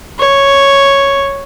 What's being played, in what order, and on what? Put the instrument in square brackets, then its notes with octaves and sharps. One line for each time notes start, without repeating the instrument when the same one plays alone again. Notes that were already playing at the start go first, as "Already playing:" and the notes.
[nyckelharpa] C#5